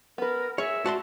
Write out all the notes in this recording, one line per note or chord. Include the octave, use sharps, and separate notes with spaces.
B3 A#4 B4
G#4 C#5 E5
F#4 D5 A5 C6